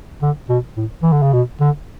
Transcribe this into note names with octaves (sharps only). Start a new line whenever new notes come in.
D3
B2
A2
E3
D3
C#3
B2
D3